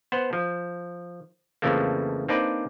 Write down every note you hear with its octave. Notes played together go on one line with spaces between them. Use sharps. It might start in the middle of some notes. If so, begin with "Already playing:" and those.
B3 C5 F#5
F3
F2 C#3 E3 F3 A3 A#3
A#3 C4 D4 D#4 B4 D5